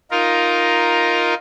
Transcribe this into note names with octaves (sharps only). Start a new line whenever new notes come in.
D#4 F4 A#4